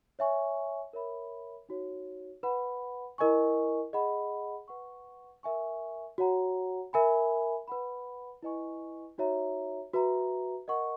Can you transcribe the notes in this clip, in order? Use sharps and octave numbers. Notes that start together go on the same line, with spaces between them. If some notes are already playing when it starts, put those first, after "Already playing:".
C#5 E5 G#5 C#6
A#4 C#5 E5 B5
D#4 F#4 C#5
B4 F#5 B5
E4 A#4 D#5 G#5 C#6
G#4 D#5 F#5 B5
B4 F#5 C#6
A#4 E5 G#5 C#6
F#4 C#5 F#5 A#5
A#4 E5 G#5 B5
B4 F#5 B5
E4 B4 D#5 G#5 C#6
D#4 F#4 C#5 E5 A#5
F#4 B4 E5 A#5
A#4 D#5 F#5 C#6